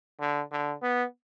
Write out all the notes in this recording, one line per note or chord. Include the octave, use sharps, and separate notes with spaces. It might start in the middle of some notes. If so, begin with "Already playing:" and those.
D3
D3
B3